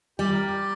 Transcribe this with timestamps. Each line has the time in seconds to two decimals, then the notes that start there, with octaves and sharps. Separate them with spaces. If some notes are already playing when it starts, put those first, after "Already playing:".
0.19 G3 G4
0.33 A#4
0.47 G4